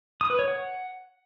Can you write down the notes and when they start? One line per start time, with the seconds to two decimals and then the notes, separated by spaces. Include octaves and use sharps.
0.21 D#6
0.30 B4
0.39 C#5
0.48 F#5